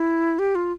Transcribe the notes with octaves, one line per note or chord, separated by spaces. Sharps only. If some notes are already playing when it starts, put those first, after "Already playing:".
Already playing: E4
G4
F4